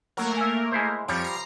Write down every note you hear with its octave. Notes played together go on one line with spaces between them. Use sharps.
F#3 A3 A#3 A#4
E5 G#5
G#3 E4 C5
F2 F3 G3 C#5 D7
A#5 C7